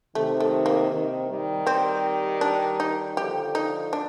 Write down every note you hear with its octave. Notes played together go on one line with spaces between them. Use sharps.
C3 D#3 A3
A3
A#3
C3 D#3
D#3 G3
C4
D4
D#4
D3 F3 G4
D#4
D4